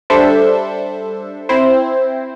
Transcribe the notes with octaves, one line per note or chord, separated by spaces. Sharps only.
G3 D4 A4 C5 E5
C4 E4 C5